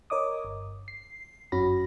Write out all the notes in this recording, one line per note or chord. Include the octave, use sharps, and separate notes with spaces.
A#4 C#5 D#5 D6 D#6
G1
C7
G1 F#2 C#4 F#4 B5 A#6